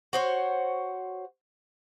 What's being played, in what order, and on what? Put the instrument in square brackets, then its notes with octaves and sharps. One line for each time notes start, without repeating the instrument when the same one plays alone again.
[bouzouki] F#4 C5 C#5